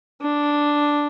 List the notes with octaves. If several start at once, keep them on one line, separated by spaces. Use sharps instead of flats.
D4